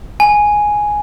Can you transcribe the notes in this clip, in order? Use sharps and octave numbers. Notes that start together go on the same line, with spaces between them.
G#5